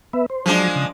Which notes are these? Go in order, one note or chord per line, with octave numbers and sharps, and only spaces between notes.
B3 B4 E5
C5
F3 F#3 G#3 D4
C#3